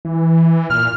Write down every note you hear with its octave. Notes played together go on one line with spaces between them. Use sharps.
E3
A#2 F6